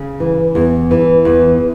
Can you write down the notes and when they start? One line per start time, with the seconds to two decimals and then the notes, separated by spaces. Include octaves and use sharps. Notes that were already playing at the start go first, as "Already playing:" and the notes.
Already playing: C#3
0.20 E3
0.55 E2
0.91 E3
1.25 E2